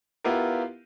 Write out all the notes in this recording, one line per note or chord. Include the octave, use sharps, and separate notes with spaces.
B3 E4 F4 G4 A#4